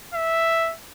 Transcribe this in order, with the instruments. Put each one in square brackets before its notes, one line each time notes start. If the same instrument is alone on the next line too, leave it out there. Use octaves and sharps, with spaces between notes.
[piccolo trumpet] E5